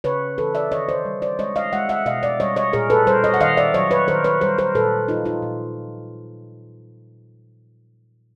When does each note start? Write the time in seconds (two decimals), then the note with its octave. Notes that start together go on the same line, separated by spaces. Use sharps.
0.04 C#3 B4 C#5
0.38 E3 A4 B4
0.55 D5 E5
0.72 D#3 C#5 D#5
0.89 C5 D5
1.05 G3
1.22 C5 D5
1.39 G#3 C#5 D#5
1.56 D#5 F5
1.73 G#3 E5 F#5
1.89 E5 F#5
2.06 B2 D#5 F5
2.23 D5 E5
2.40 G3 C#5 D#5
2.56 C#5 D#5
2.73 A#2 G#4 A#4
2.90 A4 B4
3.07 G3 A#4 C5
3.24 C#5 D#5
3.34 F#5
3.41 D#3 D#5 F5
3.57 D5 E5
3.74 F#3 C#5 D#5
3.91 B4 C#5
4.08 D#3 A#4 C5
4.24 B4 C#5
4.41 G3 A#4 C5
4.58 A#4 C5
4.75 A#2 A4 B4
5.08 F3 D#4 F4
5.25 D#4 F4
5.42 A#2